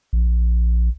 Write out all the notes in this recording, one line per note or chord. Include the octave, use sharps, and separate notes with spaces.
A#1